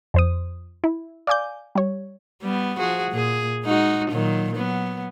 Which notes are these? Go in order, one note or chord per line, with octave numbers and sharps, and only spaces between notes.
F2 C5 D#6
E4
D5 F5 G#5 D6 G6
G3 C#5
G3 B3
F3 F#4 G#4
A#2 G#4
G#3 D#4 F#4
A#2 D#3 F#3
F#3 B3